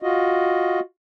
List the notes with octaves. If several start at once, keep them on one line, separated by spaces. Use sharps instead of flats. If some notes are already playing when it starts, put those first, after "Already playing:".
F4 F#4 D#5